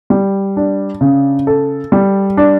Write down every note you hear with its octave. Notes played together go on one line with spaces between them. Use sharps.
G3
D4
C#3
A4
G3
D4